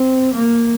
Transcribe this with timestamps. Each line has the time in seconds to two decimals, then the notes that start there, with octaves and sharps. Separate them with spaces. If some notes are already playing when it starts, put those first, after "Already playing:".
Already playing: C4
0.34 A#3